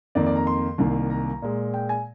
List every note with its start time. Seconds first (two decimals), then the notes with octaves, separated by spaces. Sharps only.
0.15 F2 D#3 A#3 D5
0.26 D5
0.36 A#5
0.47 C6
0.78 C2 C3 D#3 A#3
1.10 A#5
1.42 A#2 G#3
1.74 G5
1.89 G#5